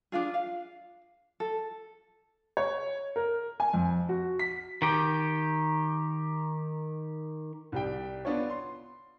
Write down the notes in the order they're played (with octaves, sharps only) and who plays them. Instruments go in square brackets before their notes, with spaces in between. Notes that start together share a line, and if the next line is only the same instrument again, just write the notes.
[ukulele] D4 D#4 F4 G#4
F5
A4
[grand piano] C#5
A#4
G#5
F2
F#4
B6
[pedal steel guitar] D#3 G4
[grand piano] C2 G3 G5
B3 D4 F4 C#5
C6